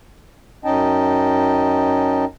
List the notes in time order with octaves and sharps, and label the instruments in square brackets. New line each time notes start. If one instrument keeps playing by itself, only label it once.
[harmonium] F#2 C#4 D#4 D#5 G5 A5